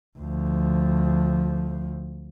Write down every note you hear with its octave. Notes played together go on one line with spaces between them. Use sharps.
D2 F3